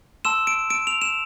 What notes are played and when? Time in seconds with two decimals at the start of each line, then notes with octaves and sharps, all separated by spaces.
0.25 A5 C6 E6 E7
0.47 D7
0.70 D7
0.87 F7
1.02 E7